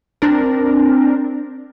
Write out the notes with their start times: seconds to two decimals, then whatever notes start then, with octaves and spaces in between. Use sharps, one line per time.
0.22 C4 D4 A#4